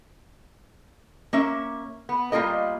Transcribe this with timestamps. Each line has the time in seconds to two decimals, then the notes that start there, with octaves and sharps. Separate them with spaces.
1.33 A#3 C#4 E5
2.09 B3
2.32 G3 A#3 F4 A#4 D#5